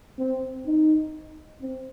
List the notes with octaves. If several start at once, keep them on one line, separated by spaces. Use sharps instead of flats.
C4
D#4
C4